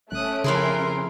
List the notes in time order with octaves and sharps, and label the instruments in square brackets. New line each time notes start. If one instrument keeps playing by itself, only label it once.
[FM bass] D#1 [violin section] A3 C#4 D7 [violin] D#6 F#6
[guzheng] F2 E4 G#4 [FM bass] C#3 [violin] A#4 C6